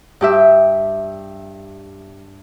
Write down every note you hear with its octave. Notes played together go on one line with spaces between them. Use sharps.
G2 G4 E5